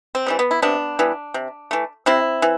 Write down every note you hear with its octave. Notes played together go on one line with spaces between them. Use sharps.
C4
E3 G3 B3
B3
E4
C3 B3 D4
E3 G3 B3
C3
E3 A3
C3 C4 E4
E3